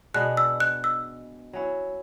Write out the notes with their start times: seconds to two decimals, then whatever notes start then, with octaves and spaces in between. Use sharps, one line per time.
0.14 B2 G#3 B3 D4 F#6
0.37 E6
0.60 F#6
0.84 E6
1.53 F#3 C#4 E4